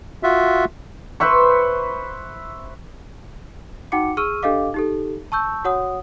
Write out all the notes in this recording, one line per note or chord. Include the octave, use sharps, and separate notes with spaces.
F4 F#4 E5
B4 C5 E5 C#6
D#4 F#4 F#5 G5 D6 C#7
G#4 C#6 E6 F6 D#7
D4 G4 A4 D#5 F5 D6
D#4 G4 A4
A5 C#6 E6 G6
F#4 C#5 F#5 D#6